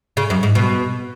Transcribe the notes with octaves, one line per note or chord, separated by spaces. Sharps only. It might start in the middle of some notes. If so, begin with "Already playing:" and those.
C#3
F#2
G#2
B2